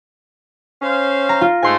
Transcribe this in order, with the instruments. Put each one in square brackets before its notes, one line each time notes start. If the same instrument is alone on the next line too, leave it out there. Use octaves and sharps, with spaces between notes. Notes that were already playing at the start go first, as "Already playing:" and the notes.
[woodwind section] C#4 C5 F5
[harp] A#5
F4
[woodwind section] G#2 A3 [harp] G#5 C6